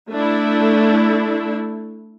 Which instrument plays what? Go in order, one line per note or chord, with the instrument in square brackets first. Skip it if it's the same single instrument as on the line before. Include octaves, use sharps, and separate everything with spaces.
[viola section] A3 D4 E4